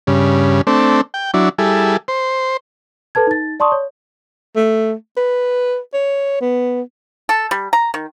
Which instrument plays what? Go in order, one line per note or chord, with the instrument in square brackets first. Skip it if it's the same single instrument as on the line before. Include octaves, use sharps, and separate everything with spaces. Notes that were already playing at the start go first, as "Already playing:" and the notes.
[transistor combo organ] G2 C#3
A3 C4 D4
G5
F#3 D4 E4
G3 E4 G#4 A4
C5
[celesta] A4 B4 A5 G#6
D#4 A6
D5 A5 C6 C#6 D#6
C#5
[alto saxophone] A3
B4
C#5
B3
[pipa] A4
G3
A#5
D#3